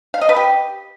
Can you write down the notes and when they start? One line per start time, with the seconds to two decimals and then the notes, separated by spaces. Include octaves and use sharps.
0.14 F5
0.21 D#5
0.29 B4
0.36 G4